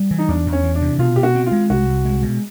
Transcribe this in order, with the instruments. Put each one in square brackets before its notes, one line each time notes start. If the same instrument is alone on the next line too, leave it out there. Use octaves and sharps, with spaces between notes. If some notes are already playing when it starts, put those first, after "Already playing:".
Already playing: [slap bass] G3
E3
[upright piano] D#4
[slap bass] E2 [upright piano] D4
[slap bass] E2
[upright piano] C#4
[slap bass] E3
[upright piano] D4
[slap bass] C3
[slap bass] B2 [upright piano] F4
[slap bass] B2 [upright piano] G4
[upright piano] F#4
[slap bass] C4
[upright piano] F4
[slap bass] G#3
[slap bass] C2 [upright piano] F#4
[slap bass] C2
G#3
B2